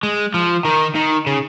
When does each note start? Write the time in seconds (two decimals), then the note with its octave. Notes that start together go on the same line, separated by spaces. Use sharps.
0.03 G#3
0.34 F3
0.65 D#3
0.95 D#3
1.26 C#3